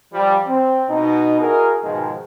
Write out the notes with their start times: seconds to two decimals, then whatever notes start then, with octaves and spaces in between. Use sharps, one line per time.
0.13 F3 G3
0.47 C4
0.89 B2 D#4
1.41 E4 F#4 G#4 A#4
1.83 G#2 B2 D#3 F3 G#3